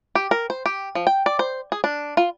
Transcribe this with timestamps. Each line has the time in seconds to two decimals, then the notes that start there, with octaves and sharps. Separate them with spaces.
0.15 G4
0.31 A#4
0.50 C5
0.66 G4
0.95 F3
1.07 G5
1.26 D5
1.39 C5
1.72 G#4
1.84 D4
2.17 F4